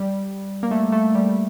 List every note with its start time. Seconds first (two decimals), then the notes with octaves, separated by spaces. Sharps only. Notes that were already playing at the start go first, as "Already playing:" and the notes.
Already playing: G3
0.63 A#3
0.71 A3
0.92 A3
1.15 G3